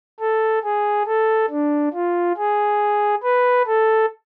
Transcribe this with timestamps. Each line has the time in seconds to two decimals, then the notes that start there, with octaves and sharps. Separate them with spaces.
0.20 A4
0.64 G#4
1.07 A4
1.50 D4
1.93 F4
2.37 G#4
3.24 B4
3.67 A4